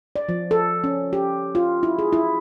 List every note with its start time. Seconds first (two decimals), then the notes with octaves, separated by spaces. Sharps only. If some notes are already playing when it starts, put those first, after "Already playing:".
0.16 D5
0.29 F3
0.51 A4
0.84 C#4
1.13 G4
1.55 F4
1.83 E4
1.99 G#4
2.13 E4